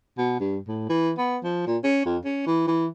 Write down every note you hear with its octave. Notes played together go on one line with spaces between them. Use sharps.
B2
G2
A2
E3
B3
F3
A#2
C#4
F2
C#4
E3
E3